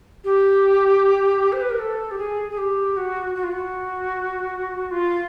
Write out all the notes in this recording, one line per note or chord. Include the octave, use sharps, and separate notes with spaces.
G4
C5
B4
A#4
A4
G4
G#4
G#4
G4
F#4
F#4
F4
F#4
F4